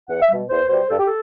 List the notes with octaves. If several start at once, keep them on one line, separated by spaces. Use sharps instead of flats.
E2 F#5
E5
B2 G3
E2 C5
B2 G3 C5
G2 A4
G4
A4